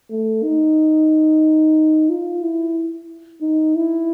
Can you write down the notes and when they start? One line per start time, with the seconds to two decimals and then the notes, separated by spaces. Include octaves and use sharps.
0.10 A3
0.43 D#4
2.10 F4
2.43 E4
3.41 D#4
3.75 E4